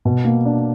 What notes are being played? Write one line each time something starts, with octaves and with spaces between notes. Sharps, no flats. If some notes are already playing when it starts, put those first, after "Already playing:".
B2
A#3
D4